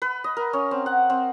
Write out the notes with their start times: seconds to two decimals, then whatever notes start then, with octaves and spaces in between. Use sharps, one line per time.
0.02 B4
0.24 D#5
0.37 A#4
0.53 C#4
0.71 C4
0.86 F#5
1.10 C4